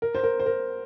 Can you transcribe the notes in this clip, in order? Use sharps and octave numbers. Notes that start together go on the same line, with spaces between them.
A#4
C5
A#4
C5
A#4